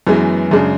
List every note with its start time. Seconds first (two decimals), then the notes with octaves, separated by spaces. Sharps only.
0.07 F#2 E3 G#3 B3
0.51 F#2 C#3 G#3 D4